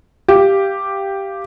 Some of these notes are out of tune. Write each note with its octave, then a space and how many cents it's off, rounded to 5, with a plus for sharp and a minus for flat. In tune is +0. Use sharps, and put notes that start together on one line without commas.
G4 +0 F5 -20